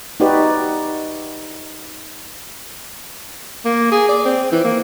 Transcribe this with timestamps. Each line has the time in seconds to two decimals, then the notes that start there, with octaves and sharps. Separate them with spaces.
0.20 D#4 F#4 G4 B4 D5
3.65 A#3
3.92 G#4
4.09 D5
4.25 C4
4.52 E3
4.64 A#3